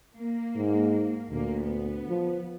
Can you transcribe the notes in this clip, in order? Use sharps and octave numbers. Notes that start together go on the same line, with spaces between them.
A#3
G#2
D2 A#2 A#3
B3
F3